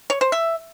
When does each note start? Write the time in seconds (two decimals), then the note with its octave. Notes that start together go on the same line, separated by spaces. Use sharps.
0.10 C#5
0.21 C5
0.32 E5